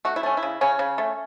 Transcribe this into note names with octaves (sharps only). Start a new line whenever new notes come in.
A3 F#4
E4
A3 C#4
E4
C#3
C#3 C#4
C#3
A3